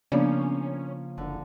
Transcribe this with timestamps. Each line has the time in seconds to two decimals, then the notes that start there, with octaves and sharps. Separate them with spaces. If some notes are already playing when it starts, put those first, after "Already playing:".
0.12 C#3 F3 A#3 B3 C#4 D4 D5
1.18 F#1 D3